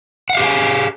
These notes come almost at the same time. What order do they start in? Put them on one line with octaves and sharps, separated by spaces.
F#5 F5 G4 G#4 G#5